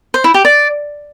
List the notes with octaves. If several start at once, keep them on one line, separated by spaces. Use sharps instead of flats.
C5
E4
G4
D5